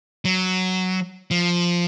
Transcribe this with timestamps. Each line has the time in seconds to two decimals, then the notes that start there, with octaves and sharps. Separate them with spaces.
0.25 F#3
1.31 F3